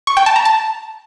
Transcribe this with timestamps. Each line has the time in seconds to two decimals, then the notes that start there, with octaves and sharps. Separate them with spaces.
0.07 C#6
0.17 G5
0.26 A5
0.36 A#5
0.45 A5